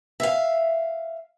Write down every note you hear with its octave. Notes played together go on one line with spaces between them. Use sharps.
E5 F5